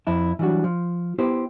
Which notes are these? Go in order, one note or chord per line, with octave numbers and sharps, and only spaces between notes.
F2 E4 A5
E3 F#3 G3 D4 F#4
F3
B3 E4 G4 C5